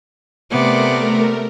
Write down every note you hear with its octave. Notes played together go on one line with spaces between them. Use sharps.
C3 A3 B3 A#4 D5